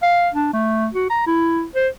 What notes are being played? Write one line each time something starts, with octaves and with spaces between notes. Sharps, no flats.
F5
D4
A3
F#4
A#5
E4
C5